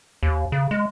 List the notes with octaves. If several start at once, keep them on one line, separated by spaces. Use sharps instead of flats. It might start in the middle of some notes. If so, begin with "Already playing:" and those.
D#2
C#3
G#3